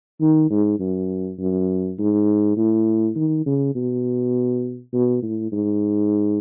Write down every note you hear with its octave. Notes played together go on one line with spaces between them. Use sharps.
D#3
G#2
F#2
F#2
G#2
A2
D#3
C#3
B2
B2
A2
G#2